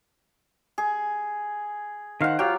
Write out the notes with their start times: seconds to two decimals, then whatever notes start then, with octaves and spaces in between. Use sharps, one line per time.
0.78 G#4
2.21 D#3 C5 F5 F#5
2.39 F#3 F4 G4 F5 G5